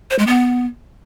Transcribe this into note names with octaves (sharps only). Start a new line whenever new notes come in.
C5
G#3
B3